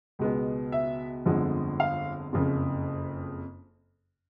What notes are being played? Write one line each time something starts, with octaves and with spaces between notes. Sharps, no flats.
C#2 B2 G#3 B3
E5
G1 F2 D3 F3 G#3
F5
F#1 F2 C#3